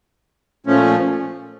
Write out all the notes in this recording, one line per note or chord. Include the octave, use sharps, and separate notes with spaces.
A#2 F3 A3 C#4